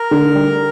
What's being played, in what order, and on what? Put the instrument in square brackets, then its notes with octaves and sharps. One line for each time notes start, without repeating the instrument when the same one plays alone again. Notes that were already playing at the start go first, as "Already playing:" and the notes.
Already playing: [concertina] A#4
[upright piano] D3
G3